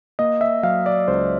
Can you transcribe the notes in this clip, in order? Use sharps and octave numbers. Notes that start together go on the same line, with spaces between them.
A#3 D#5
E5
F#3 F5
D5
C#2 C5